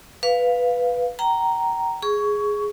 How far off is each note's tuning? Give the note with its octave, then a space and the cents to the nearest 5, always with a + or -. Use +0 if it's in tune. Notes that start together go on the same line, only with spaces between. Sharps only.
B4 +0 F5 +0
G5 -40 A#5 +0
G#4 +0 C#6 +15